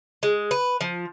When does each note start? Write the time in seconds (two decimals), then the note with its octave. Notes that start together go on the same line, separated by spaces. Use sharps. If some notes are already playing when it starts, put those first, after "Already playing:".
0.23 G#3
0.51 B4
0.81 F3